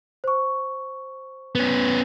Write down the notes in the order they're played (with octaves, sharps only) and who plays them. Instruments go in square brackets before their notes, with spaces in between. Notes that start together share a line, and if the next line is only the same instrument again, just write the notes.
[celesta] C5 C#6
[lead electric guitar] B3 C#4